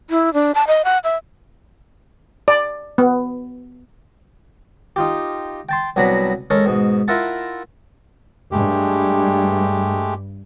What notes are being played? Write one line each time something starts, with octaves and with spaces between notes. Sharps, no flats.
E4
D4
A5
D#5
F#5
E5
D5
B3
D#4 F4 G4
G5 A5 C6
C2 F#3 B3 D4 A#5 B5
G#3 C#4 A4 A#4
G#2 B2
E4 F4 A#4 E5 F#5 A5
G2 G#3 A3 G4